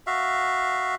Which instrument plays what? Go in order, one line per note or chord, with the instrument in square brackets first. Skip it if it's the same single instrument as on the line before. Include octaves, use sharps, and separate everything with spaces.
[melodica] F#4 E5 F5